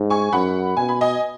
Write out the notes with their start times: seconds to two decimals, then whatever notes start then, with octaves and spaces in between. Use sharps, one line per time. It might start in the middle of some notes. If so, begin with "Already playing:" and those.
Already playing: G#2
0.10 G#5 C#6
0.32 F#2 F#5 B5
0.77 B2 G#5
0.89 B5
1.01 D#5 G#5